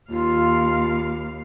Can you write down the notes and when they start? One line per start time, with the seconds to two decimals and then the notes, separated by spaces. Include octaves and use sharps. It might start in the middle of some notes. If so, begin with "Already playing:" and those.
0.10 D#2 F4 F5